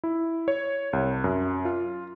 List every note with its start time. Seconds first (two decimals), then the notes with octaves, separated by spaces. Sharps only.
0.04 E4
0.48 C#5
0.93 C2
1.24 F#2
1.65 F4